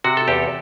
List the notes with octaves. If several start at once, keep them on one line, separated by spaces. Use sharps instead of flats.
C3 F#4
A4
E2 G4